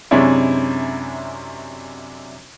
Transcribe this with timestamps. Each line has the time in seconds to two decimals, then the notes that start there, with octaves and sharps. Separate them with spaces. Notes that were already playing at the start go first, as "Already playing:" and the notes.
0.11 F#2 C3 G#3 C#4 D4 E4